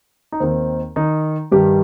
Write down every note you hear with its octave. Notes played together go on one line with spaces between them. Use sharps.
D#4
D#2 D#3 C4
D#3 D#4
G2 D#3 G3 G4